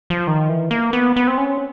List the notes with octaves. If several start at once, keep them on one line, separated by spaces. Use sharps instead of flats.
F3
D#3
E3
A#3
B3
B3
C4
C#4